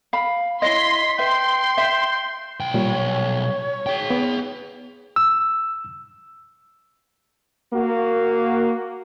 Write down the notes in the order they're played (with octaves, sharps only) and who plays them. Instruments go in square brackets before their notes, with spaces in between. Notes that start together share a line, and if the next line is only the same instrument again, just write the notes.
[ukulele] F5 B5
[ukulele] E4 C#5 D#5 [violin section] C6 B6
[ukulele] B4 E5 [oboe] G5 [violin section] C6
[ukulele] E5
[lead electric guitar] B1 G5
[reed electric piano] A#2 G3 [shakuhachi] C#5
[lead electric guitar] G#4 G5
[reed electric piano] B3
E6
[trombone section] A#3 F#4